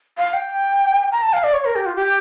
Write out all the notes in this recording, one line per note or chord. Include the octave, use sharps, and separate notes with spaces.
F5
G5
A#5
A5
F5
D5
C#5
A#4
G4
F4
G4